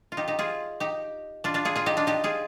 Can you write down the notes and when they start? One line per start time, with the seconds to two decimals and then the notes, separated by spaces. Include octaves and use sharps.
0.12 F4
0.17 D#4 G4
0.28 D#4 G4
0.39 F4 G#4
0.80 D#4 G4
1.44 D4 F4
1.54 D4 F4
1.65 F4 G#4
1.76 F4 G#4
1.86 D#4 G4
1.97 D4 F4
2.07 D#4 G4
2.24 F4 G#4